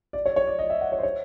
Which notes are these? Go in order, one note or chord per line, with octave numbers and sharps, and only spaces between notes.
D5
C#5
C#5
D5
D#5
E5
F#5
C#5
C5
C#5